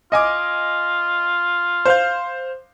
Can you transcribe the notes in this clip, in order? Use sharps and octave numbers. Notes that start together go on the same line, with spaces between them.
F4 D#5 G#5 D6
C5 F5 G6